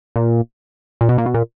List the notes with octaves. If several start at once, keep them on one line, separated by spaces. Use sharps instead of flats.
A#2
A#2
B2
A#2
B2
A#2